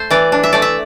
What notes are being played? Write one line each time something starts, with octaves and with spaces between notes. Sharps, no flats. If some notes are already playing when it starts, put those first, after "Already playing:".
Already playing: A3 A4 C5
E3 D5
D4
E5
A3 D5
E5